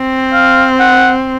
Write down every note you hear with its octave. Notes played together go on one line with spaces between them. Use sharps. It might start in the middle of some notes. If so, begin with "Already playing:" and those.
Already playing: C4
F5
F#5